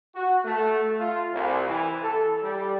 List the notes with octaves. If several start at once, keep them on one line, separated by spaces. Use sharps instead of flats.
F#4
A3
F4
C2
E3
A4
G3